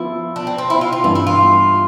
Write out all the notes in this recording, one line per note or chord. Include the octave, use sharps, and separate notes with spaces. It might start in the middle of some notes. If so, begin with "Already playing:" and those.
Already playing: F3 B3 E4 F4
D4
C4
C4
E4
F4
F4
G2 E3 B3 E4
E4
F4